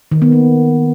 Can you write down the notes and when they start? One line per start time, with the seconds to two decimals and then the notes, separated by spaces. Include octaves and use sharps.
0.12 D#3
0.22 B3
0.32 A#3